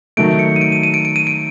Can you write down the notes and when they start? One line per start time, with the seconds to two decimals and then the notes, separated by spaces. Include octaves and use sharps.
0.17 D#3 F#3 A3 D7
0.39 C#7
0.56 D#7
0.61 D7
0.72 D#7
0.83 D#7
0.94 D7
1.05 D7
1.16 D#7
1.27 D7